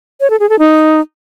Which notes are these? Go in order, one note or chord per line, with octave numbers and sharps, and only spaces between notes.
C#5
A4
G#4
A4
D#4